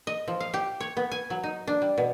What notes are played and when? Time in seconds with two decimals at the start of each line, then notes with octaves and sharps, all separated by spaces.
0.07 D#5
0.28 F3
0.40 F5
0.54 G4
0.80 C#5
0.97 B3
1.11 G#5
1.30 F#3
1.44 D#4
1.67 D4
1.82 G3
1.98 B2